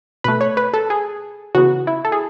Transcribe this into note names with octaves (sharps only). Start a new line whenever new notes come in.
B2 A3 B4
C#5
B4
A4
G#4
C#3 E3 B3 F#4
E4
A4
G#4